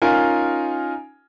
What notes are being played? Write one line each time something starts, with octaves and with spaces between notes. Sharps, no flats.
C#4 D#4 F4 A#4 G#5